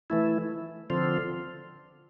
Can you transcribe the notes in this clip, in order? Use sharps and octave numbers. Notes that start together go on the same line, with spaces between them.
E3 A3 E4
D3 F3 C4 F4